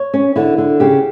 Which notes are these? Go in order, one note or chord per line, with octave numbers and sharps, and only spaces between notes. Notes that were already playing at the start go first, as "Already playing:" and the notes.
Already playing: C#5
C#4
D3 E4
D3
C#3 G4